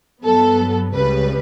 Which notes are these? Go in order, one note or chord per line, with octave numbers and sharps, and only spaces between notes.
G2 F#3 B3 A4
C#2 C#3 G3 B4